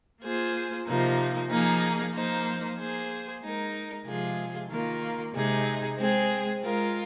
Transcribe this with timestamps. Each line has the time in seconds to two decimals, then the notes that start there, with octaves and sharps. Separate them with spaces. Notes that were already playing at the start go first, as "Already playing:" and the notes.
0.22 A#3 F4 G#4 C5
0.86 C3 F3 A#3 D#4
1.50 F3 A#3 D#4 G#4
2.13 F3 A#3 D#4 C5
2.78 A#3 G#4 C5
3.41 G#3 D#4 A#4
4.05 C3 F3 G#3 F4 G#4
4.69 D#3 A#3 F4 A#4
5.32 C3 G#3 D#4 G#4
5.97 G#3 C4 G#4
6.61 G#3 F4 A#4